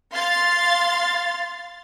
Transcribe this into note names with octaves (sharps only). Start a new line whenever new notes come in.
F5 C6 A6